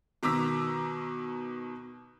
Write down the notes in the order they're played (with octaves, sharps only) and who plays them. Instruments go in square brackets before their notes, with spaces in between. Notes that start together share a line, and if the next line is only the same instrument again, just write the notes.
[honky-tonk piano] B2 D#3 A#5 D6 E6 B6